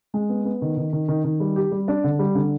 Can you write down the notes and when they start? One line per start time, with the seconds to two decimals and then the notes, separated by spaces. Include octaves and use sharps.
0.14 G#3
0.29 B3
0.45 B3
0.62 D#3
0.77 D#3
0.93 D#3
1.08 D#3
1.24 D#3
1.40 G3
1.56 G4
1.71 G3
1.88 D4
2.04 D3
2.19 G3
2.35 D3